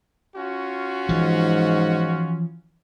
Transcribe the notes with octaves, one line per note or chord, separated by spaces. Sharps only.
C#4 F4 F#4
G#2 E3 F3